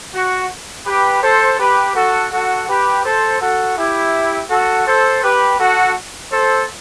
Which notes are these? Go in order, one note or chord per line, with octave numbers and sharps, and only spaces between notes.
F#4
G4 B4
A4 C5
G4 B4
F#4 A4
F#4 A4
G4 B4
A4 C5
F#4 A4
E4 G4
F#4 A4
A4 C5
G4 B4
F#4 A4
A4 C5